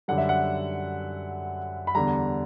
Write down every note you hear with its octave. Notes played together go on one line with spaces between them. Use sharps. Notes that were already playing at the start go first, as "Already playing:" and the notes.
F#2 D3 G3 F#5
E5
F#5
B5
E2 D3 G3 A#5